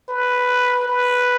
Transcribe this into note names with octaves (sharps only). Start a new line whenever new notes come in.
B4
B4